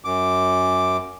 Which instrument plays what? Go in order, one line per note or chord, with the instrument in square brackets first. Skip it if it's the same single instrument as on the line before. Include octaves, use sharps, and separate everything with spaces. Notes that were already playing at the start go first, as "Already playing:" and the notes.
[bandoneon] F#2 D6